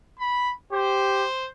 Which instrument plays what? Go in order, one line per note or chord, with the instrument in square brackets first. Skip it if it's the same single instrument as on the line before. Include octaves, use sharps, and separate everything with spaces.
[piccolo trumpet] B5
[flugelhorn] G4 [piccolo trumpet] C5